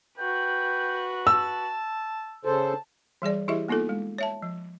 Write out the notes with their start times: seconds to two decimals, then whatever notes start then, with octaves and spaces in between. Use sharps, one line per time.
0.18 F#4 B4 G5
1.27 A5 E6
2.45 C#3 A4 C5 A5
3.22 E3 G3 G#4 D5
3.48 E3 E4 G4 G#4 D#5 E5
3.68 A#3 B3 D#4 F4 A4
3.89 G#3
4.18 C#5 E5 A5
4.42 F3